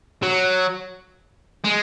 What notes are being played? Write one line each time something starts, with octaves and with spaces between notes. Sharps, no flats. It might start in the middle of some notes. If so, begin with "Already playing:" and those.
F#3
G#3